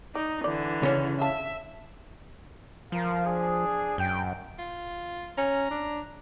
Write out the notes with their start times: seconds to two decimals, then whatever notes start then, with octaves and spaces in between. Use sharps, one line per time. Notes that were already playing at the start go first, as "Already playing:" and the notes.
0.15 D#4 D5
0.44 D3 E3 D5
0.83 C#3 C#4
1.22 E5 F5 A5
2.92 F3 A#4 F5
3.25 D4 G#4
3.98 F#2 G5
4.59 F4
5.38 C#4 A#5
5.71 D4